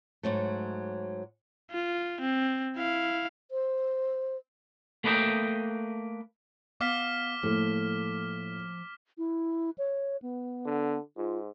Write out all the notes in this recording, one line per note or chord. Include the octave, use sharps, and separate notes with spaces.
G#2 F#3 A3
F4
C4
E4 F5
C5
A3 A#3 B4 D#5 G5
B3 D#5 F5 D6 F6 B6
A2 F3 A3 A#3
E4
C#5
B3
D3
G#2 F4